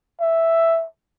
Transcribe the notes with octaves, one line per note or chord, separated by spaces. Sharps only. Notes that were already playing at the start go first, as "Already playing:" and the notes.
E5